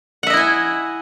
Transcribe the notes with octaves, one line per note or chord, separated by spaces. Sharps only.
E4 D#5 E5 F#5 G#5